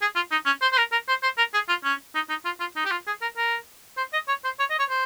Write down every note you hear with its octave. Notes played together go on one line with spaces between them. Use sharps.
G#4
F4
D#4
C#4
C5
C5
A#4
A#4
C5
C5
A#4
G#4
F4
C#4
D#4
D#4
F4
F4
D#4
G4
F4
G#4
A#4
A#4
C5
D#5
C#5
C5
C#5
D#5
C#5
C5